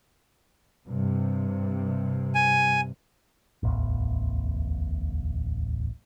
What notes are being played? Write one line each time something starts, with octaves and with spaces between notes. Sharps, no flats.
G2 C3
G#5
D1 A1 E2